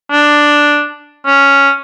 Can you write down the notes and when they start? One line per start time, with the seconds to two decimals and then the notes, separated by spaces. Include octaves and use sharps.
0.11 D4
1.26 C#4